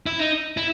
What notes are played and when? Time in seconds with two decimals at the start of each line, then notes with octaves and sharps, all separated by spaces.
0.06 E4
0.19 D#4
0.57 E4